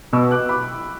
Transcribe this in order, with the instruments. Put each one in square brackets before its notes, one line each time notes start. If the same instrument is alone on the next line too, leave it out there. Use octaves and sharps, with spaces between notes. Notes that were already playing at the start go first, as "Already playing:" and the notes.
[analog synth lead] B2 [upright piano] C#6 E6
[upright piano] D6 F#6
B5 D6